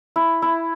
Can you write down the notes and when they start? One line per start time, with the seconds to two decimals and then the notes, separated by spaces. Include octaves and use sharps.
0.16 E4
0.42 E4